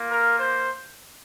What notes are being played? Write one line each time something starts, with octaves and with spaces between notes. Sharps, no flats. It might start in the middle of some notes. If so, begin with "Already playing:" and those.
Already playing: A#3 F4
A#4
C5